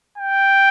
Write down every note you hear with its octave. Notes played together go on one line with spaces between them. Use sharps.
G5